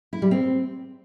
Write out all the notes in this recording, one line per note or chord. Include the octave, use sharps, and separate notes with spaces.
E4
G3
C4